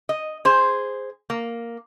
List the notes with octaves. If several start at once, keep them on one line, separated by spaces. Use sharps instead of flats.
D#5
G#4 C5
A#3